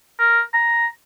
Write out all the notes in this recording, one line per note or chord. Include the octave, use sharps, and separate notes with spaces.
A#4
A#5